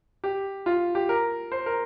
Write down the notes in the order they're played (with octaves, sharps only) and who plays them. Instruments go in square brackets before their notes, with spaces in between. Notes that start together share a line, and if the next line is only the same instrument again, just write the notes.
[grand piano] G4
F4
G4
A#4
C5
A#4